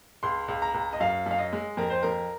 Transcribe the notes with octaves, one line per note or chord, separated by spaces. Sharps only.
C#2 C6
C#2
A#5
C#2
D#5
F#2 F5
F#2 F5
D#5
G#3
F2 A#4
C5
F2 A#4